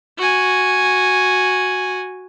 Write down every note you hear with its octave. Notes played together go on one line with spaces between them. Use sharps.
F#4 G#5